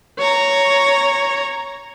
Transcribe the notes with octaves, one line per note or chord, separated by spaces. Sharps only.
C#5 A#5